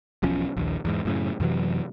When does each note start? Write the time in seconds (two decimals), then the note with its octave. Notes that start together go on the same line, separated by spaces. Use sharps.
0.23 E1 B1 F3 C#4
0.57 A#1 D#2
0.85 E2 G#2
1.05 F#2 A2 C#3
1.40 F#2 C3 E3 F#3